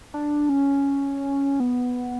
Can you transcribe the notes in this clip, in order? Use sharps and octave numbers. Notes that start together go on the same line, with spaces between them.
D4
C#4
B3